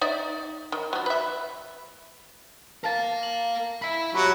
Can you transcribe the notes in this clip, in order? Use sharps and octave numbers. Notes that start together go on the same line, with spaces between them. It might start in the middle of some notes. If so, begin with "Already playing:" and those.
D#4 D5 E5
D#3
F3 F#3
B4 E5
A#4 F5 A5 A6
F#7
E5 B5 B6
F#3 G4 B5